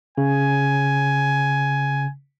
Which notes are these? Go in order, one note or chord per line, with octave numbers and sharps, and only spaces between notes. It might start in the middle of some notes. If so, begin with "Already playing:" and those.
C#3 G#5